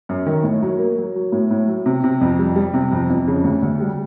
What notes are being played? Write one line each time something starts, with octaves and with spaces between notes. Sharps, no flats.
F#2
D#3
A2
F#3
A#3
F#3
F#3
A2
A2
F#3
C3
C3
F2
G3
G3
C3
F2
F2
C#3
D2
D2
G3